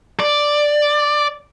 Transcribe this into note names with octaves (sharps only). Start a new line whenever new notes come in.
D5